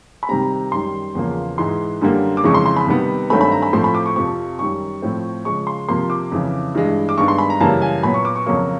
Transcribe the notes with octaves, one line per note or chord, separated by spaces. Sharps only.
B5
C3 D#3 G3 C4 A#5
F#2 D#3 G3 C6
E2 C#3 F3 A#3
G#2 E3 G#3 C6
F#2 D3 G3 A#3
D6
F2 C#3 E3 G#3 C#6
C6
C6
B5
C3 D#3 G3 B3
G2 D#3 F#3 A3 C4 B5
B5
A#5
B5
A2 F3 A3 C4 C6
B5
D6
C#6
F2 C3 F3 C#6
F#2 D#3 G3 C#6
A2 F3 A3 C4
C#3 F3 G#3 C#6
C6
C3 F3 A#3 C6
D6
F2 C#3 E3
G2 E3 G#3
D6
G2 D#3 G#3 B3 C#6
C6
B5
A#5
F#2 C#3 E3 G3 A#3 A5
G#5
A#2 F#3 B3 B5
C#6
D6
C#6
F2 C#3 F#3 A#3 C#6